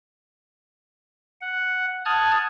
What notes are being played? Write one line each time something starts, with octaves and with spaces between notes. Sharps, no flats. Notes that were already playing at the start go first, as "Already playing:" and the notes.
F#5
A5 D#6 F6 F#6 G#6